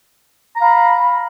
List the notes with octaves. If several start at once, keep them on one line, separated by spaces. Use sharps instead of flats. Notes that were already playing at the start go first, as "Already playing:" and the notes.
F5 A#5 B5